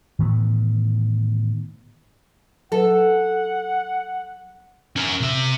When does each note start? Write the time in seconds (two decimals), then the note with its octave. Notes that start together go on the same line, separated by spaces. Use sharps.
0.19 A2 D#3 E3 B3
2.72 F#3 A4 B4 F#5
4.96 C#4 A#4
5.21 C3 E5